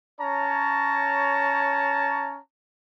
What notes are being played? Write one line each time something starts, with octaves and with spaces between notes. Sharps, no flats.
C#4 C#5 A5 A#5